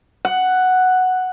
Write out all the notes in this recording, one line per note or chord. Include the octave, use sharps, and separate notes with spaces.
F#5